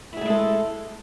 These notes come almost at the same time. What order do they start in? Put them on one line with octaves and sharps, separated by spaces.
E4 G#4 A3 G#3 A4